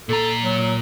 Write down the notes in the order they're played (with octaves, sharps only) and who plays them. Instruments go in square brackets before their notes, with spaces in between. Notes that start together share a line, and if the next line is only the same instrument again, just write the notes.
[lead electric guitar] A#2 A#5 [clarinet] A4
[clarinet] F#3